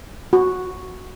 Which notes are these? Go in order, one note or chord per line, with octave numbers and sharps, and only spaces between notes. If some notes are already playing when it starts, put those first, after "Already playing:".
F#4